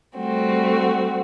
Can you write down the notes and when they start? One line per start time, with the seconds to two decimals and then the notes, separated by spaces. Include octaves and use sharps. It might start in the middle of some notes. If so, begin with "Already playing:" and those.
0.17 G3 A3 C4 F#4